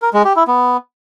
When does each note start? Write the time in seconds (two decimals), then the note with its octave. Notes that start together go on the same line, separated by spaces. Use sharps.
0.02 A#4
0.14 G#3
0.25 G4
0.36 E4
0.48 B3